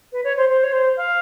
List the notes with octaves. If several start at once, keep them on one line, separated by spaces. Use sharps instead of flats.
B4
C#5
C5
C5
C#5
C5
F5